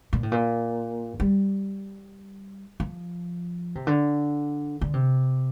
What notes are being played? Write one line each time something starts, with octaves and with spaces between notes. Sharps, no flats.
A#2
A2
A#2
G3
F3
C3
D3
D3
C3